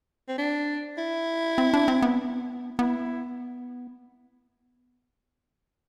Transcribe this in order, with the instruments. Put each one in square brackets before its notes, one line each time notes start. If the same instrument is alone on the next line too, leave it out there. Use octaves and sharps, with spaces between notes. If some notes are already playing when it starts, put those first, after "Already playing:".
[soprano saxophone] C4
D4
E4
[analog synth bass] C4
D4
C4
B3
[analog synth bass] B3 [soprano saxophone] E4